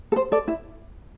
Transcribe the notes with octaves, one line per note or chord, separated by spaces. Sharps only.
A4
C5
A4 D5
E4